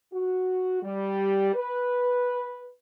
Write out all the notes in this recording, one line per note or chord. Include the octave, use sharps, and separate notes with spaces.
F#4
G3
B4